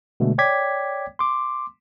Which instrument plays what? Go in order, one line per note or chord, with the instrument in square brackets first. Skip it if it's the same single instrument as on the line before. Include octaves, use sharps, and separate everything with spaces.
[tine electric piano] B2 D3 G#3 A3
C#5 D5 G5 D6 G#6 B6
C6 D6